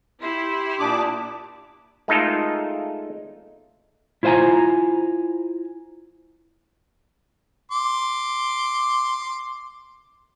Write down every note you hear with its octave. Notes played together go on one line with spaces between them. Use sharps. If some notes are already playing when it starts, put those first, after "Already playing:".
E4 G4 C6
A#2 D4 D6 D#6
G#3 A3 D#4 F4 A4 A#4
E4 F4 C5 D#5 G#5 A#5
C6 D6